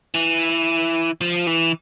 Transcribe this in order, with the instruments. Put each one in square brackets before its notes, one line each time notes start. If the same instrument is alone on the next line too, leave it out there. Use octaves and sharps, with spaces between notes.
[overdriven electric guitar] E3
F3
E3